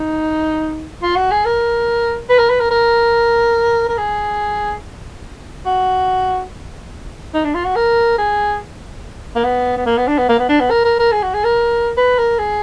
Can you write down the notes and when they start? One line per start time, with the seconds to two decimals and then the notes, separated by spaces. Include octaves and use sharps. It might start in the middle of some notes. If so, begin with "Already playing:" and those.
Already playing: D#4
1.02 F4
1.16 F#4
1.31 G#4
1.45 A#4
2.29 B4
2.39 A#4
2.50 B4
2.60 A#4
2.71 A#4
3.89 A#4
3.98 G#4
5.66 F#4
7.34 D#4
7.44 D4
7.54 F4
7.65 F#4
7.76 A#4
8.18 G#4
9.35 A#3
9.44 B3
9.77 B3
9.86 A#3
9.97 B3
10.07 D4
10.18 B3
10.29 A#3
10.39 B3
10.49 D4
10.61 B3
10.70 A#4
10.85 A#4
10.99 A#4
11.12 G#4
11.23 F#4
11.34 G#4
11.44 A#4
11.97 B4
12.18 A#4
12.38 G#4